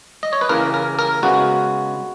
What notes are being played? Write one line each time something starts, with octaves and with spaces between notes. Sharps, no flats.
D#5
C#5
B4
C#3 E3 A#3 A#4
A#4
A#4
C#3 G#3 B3 F#4